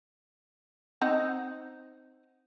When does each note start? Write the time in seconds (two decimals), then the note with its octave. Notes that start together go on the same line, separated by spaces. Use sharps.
1.01 C4 D#4 F#5